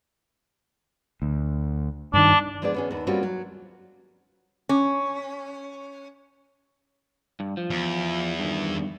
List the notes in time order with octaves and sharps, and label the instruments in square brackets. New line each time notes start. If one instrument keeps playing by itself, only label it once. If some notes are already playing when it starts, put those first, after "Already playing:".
[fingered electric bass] D2
[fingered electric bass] G2 D#3 [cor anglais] D4
[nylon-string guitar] F3 G#3 B3 D4 G#4 D5
B3 C#4 G#4
D#2 B3
G3 A#3 C4 C#4 F4 F#4
F#3
[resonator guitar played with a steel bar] C#4
[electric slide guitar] G2
F3
[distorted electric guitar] E2
[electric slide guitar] G2 D#3